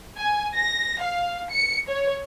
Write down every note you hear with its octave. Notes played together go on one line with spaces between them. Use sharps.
G#5
A#6
F5
C#7
C#5